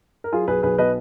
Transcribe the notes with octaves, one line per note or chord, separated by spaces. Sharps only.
A#4
F#3 F4 G#4
B1 G#4 B4
B1 G#4 B4
B2 B4 D#5